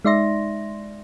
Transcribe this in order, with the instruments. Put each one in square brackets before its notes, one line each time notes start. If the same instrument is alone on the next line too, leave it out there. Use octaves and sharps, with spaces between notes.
[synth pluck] G#3 D#4 D5 E5 C6 A#6